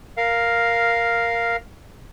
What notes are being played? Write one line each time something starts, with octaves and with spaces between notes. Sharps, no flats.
A#4 F5